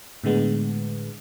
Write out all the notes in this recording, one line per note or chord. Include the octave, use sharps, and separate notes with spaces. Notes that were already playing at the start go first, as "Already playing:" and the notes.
A2 D3 G#3 B3